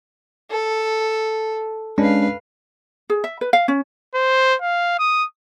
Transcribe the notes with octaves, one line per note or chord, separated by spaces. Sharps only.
A4
G#3 C#4 D4 B4 F5
G#4
E5
B4
F5
C#4
C5
F5
D#6